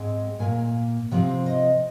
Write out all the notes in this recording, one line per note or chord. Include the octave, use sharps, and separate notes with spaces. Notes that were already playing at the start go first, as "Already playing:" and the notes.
Already playing: G#2 G#3 C4
A#2 A#3 G#5
C3 F3 C4
D#5